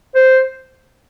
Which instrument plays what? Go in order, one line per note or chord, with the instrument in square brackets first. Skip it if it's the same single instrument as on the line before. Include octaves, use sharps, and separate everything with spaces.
[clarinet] C5